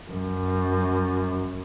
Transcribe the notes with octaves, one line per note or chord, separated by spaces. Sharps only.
F#2